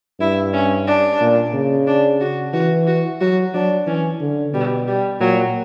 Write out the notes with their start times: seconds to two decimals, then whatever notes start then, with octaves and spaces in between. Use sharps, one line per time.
0.20 G2 E4
0.53 C#4
0.87 D4
1.21 A#2
1.53 C#3
1.87 D4
2.21 F#4
2.54 E3 F#4
2.87 F#4
3.21 F#3 F#4
3.54 F#3 D4
3.87 E3 C#4
4.21 D3
4.54 B2 G3
4.87 G3
5.20 A#2 F#3